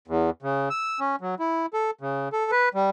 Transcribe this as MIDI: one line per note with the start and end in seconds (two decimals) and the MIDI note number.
0.08 0.30 40
0.42 0.69 49
0.70 1.00 88
1.00 1.16 61
1.21 1.35 54
1.40 1.66 64
1.74 1.91 69
2.01 2.29 49
2.33 2.51 69
2.51 2.69 71
2.74 2.90 55